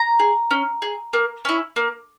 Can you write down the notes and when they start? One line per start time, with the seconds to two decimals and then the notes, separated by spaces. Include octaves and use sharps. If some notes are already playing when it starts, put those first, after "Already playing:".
Already playing: A#5
0.19 G#4
0.51 C#4
0.82 G#4
1.13 A#3
1.45 C#4 E4
1.76 A#3